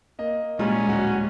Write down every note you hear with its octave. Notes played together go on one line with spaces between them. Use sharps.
A#3 D#5
A#2 G3 G#3 C#4
D1 F#4